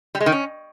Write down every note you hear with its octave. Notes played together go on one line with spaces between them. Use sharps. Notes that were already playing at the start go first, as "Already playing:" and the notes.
G3
G#3
D#3
C#4